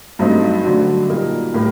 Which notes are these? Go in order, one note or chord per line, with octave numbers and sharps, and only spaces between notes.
G2 F#3 A3 C4 D#4
D3 F#3 A3 D4 F#4
A#2 G3 A#3 D#4
A2 G3 A#3